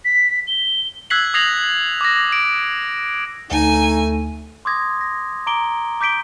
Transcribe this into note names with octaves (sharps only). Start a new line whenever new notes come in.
B6
G7
E6 F#6 G#6 B6 C7 F#7
D#6 G#6 A#6 C7 F7 F#7
D6 A#6
D7
D2 A3 D#4 G#5
C6 D6 D#6 G#6 A#6
A#6
A#5 D6 D7 G7
D6 G6 B6 D7 G7